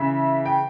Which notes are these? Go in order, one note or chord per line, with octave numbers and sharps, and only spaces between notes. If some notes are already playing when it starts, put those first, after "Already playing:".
Already playing: C#3 E3 E5
G5